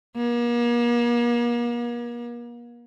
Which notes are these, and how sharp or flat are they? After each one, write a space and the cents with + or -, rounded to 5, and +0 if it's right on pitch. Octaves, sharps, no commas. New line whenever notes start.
A#3 +40